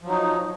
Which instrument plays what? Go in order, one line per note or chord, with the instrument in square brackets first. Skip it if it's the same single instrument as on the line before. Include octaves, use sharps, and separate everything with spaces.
[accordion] F3
F#3
D#4